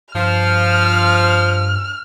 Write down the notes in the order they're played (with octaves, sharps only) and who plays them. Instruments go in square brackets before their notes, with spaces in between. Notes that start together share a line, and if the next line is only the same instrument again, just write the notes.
[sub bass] G2 [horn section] F3 [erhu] F6